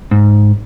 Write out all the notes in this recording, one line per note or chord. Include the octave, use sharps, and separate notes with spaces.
G#2